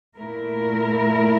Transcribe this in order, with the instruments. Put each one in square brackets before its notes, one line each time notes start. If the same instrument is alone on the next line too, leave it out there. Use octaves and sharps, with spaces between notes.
[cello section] A#2 A3 E4 A#4